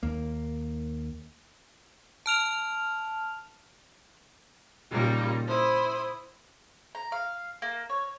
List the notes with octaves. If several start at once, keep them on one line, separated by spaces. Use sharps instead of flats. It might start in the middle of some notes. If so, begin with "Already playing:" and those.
D#2 A#3
A5 F6 F7
A#2 C#3 G3 A#3 D#4
E4 C5 D#6
A#5
F5
A#3
C#5